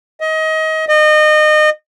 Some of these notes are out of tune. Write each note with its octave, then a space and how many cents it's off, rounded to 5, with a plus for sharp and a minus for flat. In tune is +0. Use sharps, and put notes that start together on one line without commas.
D#5 +25
D#5 -30